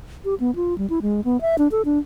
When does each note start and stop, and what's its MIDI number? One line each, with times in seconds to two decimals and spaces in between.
0.25 0.35 67
0.40 0.54 59
0.56 0.76 65
0.78 0.89 55
0.90 0.99 64
1.02 1.24 56
1.24 1.40 59
1.41 1.56 76
1.58 1.68 62
1.72 1.82 69
1.85 1.99 62